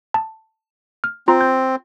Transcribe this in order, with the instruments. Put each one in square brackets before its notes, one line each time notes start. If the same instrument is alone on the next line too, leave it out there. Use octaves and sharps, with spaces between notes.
[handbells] A5
F6
[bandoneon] C4 [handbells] F4 A#5 C6
[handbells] G6